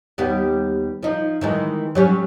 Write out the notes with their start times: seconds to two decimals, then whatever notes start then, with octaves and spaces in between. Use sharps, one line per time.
0.18 D#2 G3 B3
1.03 F3 D#4
1.41 D#3 E3 G#3
1.95 F#3 G3 C#4